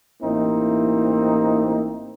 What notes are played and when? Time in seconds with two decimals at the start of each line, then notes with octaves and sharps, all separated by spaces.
0.22 A1 A#3 C4 D#4 E4